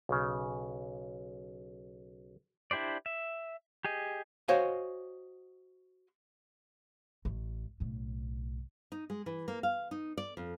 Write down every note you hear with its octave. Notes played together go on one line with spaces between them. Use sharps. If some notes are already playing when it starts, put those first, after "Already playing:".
B1 C#3
D4 E4 G4 C5 D5
E5
G4 G#4 D#5
F#4 C5 C#5 D#5 F5 G#5
A1
B1 A2
D#4
G#3
E3
A#3
F5
D#4
D5
F2